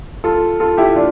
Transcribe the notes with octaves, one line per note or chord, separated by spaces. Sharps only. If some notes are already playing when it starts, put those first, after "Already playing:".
F4 A4
F4 A4
E4 G4
D4 F4